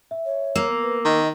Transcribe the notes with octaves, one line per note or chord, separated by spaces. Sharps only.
E5
C#5
A#3 E6
B4
D#3 D#5